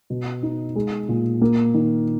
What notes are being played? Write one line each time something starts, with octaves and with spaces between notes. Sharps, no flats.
B2
D#4
G#3
A#2
A#3
D#3